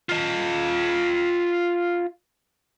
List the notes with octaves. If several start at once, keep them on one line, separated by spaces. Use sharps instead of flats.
F4 D#5